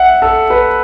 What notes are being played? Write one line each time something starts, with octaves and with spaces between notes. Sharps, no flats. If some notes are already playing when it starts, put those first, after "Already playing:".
Already playing: E5 F#5
A4
B4